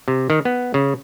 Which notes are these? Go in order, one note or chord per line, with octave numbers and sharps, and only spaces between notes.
C3
D#3
B3
C#3